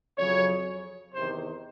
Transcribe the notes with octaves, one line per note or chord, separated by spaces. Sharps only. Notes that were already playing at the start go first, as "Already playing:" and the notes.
F2 C#3 F#3 C#5
E2 C3 D#3 C5